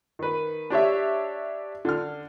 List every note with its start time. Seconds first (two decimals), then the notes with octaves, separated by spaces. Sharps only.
0.19 D#3 B4
0.70 D4 G4 C#5 E5
1.85 D3 F6